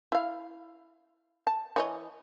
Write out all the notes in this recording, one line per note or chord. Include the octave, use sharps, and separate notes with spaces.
E4 F5
A5
E3 C#5 D#5